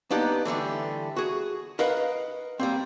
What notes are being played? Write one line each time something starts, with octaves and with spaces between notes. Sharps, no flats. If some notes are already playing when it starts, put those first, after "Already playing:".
A#3 B3 D4 D#4 G4
D3 E3 G3 A3
F#4 G#4
A#4 B4 D#5 F5 F#5
G3 A#3 C4